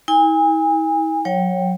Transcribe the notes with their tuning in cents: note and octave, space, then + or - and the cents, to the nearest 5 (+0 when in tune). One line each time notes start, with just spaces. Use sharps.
E4 -45 G#5 -30
F#3 -20 C#5 -10 G5 +0